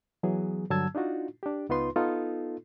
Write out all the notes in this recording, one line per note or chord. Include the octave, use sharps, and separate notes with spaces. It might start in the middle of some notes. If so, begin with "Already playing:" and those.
E3 F#3 B3 G#4
G2 D3 F#3 A5 E6 G#6
D4 D#4 F4 F#4
D4 G4
C#2 B3 D#4 F4 B4 C6
B3 D#4 F4 A4